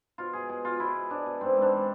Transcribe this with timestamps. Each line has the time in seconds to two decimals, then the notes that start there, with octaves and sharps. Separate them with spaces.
0.18 B2 F4
0.33 B2 G#4
0.49 B2 G#4
0.65 B2 F4
0.80 B2 E4
0.95 B2
1.10 B2 D4
1.26 B2
1.41 G#2 C4
1.57 G#2 D4
1.72 E3